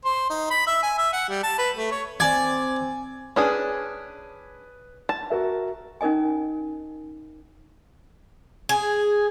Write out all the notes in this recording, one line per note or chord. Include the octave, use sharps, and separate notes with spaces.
C5
D#4
B5
E5
G#5
E5
F#5
G3
A5
B4
A3
C#5
C4 D5 G#5 G#6
C#4 D4 G#4 B4 D#6
A5
F#4 A#4 E5
C#4 D#4 A#4 D#5 G#5
G#4